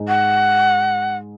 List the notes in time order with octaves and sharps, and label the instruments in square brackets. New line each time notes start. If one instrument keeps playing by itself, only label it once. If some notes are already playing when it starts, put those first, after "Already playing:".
Already playing: [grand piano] G#2 G#3 D#4
[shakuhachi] F#5